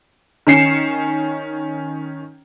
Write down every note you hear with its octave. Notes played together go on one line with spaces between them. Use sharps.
D#3 C#4 C7 C#7 E7